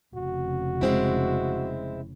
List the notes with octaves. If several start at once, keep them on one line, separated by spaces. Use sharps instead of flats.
F1 C#3 F#4
G#3 C4 E4